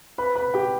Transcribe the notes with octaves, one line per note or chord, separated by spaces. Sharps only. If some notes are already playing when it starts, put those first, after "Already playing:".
B4 B5
B4 B5
G4 G5